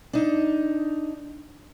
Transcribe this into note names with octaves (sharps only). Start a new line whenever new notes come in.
D4 D#4